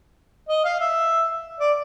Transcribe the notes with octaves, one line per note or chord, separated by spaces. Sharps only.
D#5
F5
E5
D5